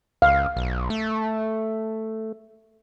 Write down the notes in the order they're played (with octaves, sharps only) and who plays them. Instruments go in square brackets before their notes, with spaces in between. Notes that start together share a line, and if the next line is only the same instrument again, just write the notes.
[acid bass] C#2 [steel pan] F5
[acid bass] B1
A3